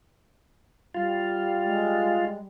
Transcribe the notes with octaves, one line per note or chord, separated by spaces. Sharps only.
G3 F4
G#3